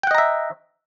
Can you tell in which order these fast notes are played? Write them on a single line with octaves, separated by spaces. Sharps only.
G5 F#5 D#5 A#5 E5